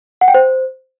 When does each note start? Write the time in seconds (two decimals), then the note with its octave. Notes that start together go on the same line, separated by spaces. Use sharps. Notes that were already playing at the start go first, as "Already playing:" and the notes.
0.21 F#5
0.28 G5
0.34 C5